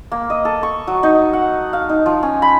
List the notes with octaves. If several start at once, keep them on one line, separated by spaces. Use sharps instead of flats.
A#3
D#5
A4
C#6
F#3
D#4
F#5
F5
D#4
F3
C#4
B5